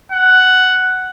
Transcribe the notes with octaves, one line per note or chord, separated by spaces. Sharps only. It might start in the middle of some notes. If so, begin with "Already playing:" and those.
F#5